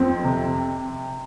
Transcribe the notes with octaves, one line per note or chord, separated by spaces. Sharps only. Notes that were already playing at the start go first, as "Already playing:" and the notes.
Already playing: F2 C4
C3